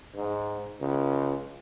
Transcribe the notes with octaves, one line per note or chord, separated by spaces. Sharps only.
G#2
C#2